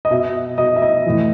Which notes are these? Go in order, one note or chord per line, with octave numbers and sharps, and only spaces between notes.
D#5
B2 E5
B2 D#5
E5
D#5
A2 E3